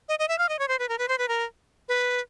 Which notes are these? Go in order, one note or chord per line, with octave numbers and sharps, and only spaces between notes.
D#5
D#5
E5
F5
D#5
C#5
C5
B4
A#4
B4
C5
B4
A#4
B4